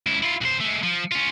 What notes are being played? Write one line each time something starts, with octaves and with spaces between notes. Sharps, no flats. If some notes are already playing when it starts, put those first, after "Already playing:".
C#2 E4
E4 F4
B1 C5
G#3 A3
F3
C#4 F4